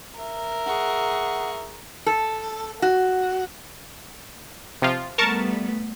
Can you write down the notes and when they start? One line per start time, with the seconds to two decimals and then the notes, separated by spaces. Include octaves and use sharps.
0.19 A#4 E5
0.66 G#4 F#5 C#6
2.06 A4
2.82 F#4
4.82 C3 F3 F4
5.18 G3 A3 B3 A#4 A5 C#6